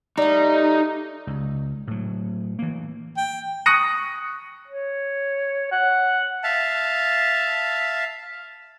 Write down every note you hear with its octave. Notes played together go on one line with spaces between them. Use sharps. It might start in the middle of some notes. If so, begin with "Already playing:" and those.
G3 A3 D#4
C#2
A2 F#3
E3 A#3
G5
C#6 D#6 F#6 A#6 C#7 D#7
C#5
F#5
E5 F5 A5